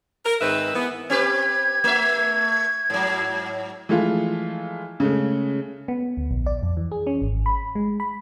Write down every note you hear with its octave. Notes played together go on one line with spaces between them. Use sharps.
A#4
G#2 D#3 C4 B4 E5
E3 B3
C4 G4 B4 G#6
A3 E5
G#2 F#3
E3 F3 G#3 A3 F4
C#3 G#3 A3
B3
D2
A#1
D5
F2
E3
G#4
C#4
G#1
B5
G#3
B5